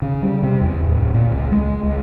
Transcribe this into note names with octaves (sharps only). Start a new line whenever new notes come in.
C#3
G3
C3
E2
D1
A#2
C#2
G#3
C#2